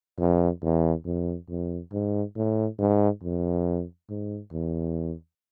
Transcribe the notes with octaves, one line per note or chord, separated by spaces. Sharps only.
F2
E2
F2
F2
G#2
A2
G#2
F2
G#2
E2